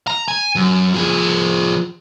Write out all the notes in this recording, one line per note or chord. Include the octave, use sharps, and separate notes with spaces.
A#5
G#5
F#2
F3 G#4